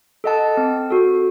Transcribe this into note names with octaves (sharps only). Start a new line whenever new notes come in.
A4 D#5 F#5 A5
C4
F#4 A4